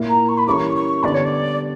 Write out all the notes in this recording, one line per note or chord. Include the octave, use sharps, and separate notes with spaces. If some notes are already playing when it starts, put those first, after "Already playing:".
Already playing: A#2 A#3 E4 A#4
A#5
C#6
B5
E3 G3 C#4 E4 A#4 C#6 D6
C#6
D3 G3 B3 D4 D5
C#5
D5